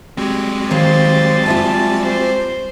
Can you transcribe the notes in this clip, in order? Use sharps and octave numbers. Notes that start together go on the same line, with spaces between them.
G3 G#3 C4 F#4 G4
D#3 C5 C#5 F5 A6
F4 E5 G#5 A5
C5